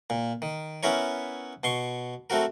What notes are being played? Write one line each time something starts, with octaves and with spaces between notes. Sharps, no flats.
A#2
D#3
B3 C#4 E4 A#4 C#5
B2 C6 C#6
A3 C4 F#4 A#4